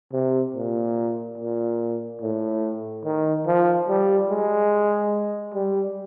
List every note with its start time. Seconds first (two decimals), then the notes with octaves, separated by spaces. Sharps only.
0.13 C3
0.55 A#2
1.38 A#2
2.21 A2
3.05 D#3
3.47 F3
3.88 G3
4.30 G#3
5.54 G3